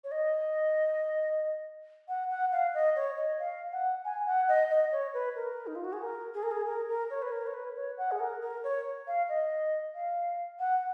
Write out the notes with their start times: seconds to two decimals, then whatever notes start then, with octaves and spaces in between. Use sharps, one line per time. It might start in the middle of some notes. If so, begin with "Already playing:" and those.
0.04 C#5
0.11 D#5
2.08 F#5
2.30 F#5
2.52 F5
2.74 D#5
2.96 C#5
3.17 D#5
3.39 F5
3.72 F#5
4.04 G#5
4.26 F#5
4.48 D#5
4.70 D#5
4.92 C#5
5.14 B4
5.36 A#4
5.67 D#4
5.75 F4
5.84 F#4
5.93 G#4
6.01 A#4
6.34 G#4
6.43 A#4
6.51 G#4
6.66 A#4
6.88 A#4
7.10 C#5
7.22 B4
7.32 A#4
7.46 C#5
7.54 B4
7.76 C#5
7.98 F#5
8.11 G#4
8.20 A#4
8.42 A#4
8.64 C#5
9.07 F5
9.29 D#5
9.95 F5
10.59 F#5